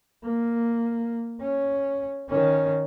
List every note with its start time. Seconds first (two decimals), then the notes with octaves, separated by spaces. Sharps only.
0.24 A#3
1.40 C#4
2.29 D#3 C#4